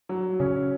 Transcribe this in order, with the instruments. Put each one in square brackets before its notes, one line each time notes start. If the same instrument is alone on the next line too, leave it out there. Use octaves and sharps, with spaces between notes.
[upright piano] F#3
[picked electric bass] C#3 [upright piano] C#4